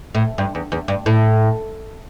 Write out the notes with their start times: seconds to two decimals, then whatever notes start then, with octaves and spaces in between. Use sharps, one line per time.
0.15 A2
0.38 G2
0.55 E2
0.72 E2
0.88 G2
1.06 A2